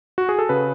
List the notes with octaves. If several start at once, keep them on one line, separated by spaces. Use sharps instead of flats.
F#4
G#4
A4
C#3 B4